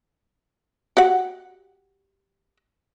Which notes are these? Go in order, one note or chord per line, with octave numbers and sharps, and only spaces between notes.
F#4 G4 F#5